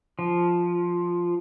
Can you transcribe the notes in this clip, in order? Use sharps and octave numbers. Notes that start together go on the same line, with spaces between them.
F3